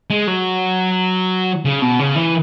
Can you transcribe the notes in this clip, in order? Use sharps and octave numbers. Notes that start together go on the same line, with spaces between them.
G#3
F#3
C#3
B2
C#3
E3